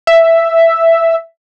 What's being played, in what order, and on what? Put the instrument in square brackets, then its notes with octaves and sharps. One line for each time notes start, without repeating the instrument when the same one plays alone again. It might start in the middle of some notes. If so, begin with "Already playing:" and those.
[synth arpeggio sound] E5